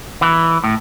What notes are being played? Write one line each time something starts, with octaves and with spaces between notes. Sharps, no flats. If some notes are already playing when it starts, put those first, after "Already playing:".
E3
A2